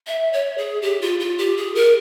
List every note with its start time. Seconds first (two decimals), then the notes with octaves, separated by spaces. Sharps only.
0.07 E5
0.33 C#5
0.58 G#4
0.82 G4
1.02 F4
1.20 F4
1.38 G4
1.57 G#4
1.75 A#4